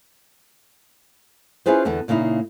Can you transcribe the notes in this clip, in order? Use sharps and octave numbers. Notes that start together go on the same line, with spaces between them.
C#4 E4 F4 G#4 B4 C5
E2 D3 B3 E4 A5
A#2 C#3 A#3 D#4 E4